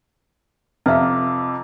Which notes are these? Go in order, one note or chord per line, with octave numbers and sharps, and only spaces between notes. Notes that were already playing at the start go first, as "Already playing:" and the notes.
F2 C3 B4 E5 F5 A#5 D6